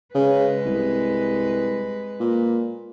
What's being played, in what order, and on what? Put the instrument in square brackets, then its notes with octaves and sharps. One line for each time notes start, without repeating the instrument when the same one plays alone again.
[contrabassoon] C#3 [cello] G#3 B4
[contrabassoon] C2
A#2